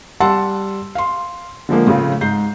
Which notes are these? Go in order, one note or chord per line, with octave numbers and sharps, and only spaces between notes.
G3 F#5 A5 C6 E6
F5 C6
D3 F3 G#3 A#3
A2 C#3 F4
G#2 G6 C7